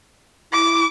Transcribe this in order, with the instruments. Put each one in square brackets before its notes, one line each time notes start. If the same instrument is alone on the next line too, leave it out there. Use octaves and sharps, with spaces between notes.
[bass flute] E4 [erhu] D6